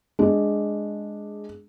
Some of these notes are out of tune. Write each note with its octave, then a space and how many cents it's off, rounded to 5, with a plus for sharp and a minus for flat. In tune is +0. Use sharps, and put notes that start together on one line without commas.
G#3 +0 D4 +0